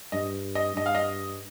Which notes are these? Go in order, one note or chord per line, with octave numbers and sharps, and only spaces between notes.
G2 D#5
D#5
G2 D#5
F5
D#5